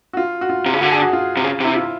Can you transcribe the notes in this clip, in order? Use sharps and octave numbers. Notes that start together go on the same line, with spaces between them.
F#4
F4
F#4
F4
C3
C#3
D3 F#4
G#4
F#4
F4
C3
C#3
C3 E4
F4